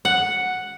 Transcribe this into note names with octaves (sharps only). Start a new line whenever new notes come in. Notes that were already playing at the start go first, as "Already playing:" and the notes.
F#5